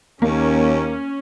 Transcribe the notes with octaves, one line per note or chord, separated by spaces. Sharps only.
D#2 A#3 C#4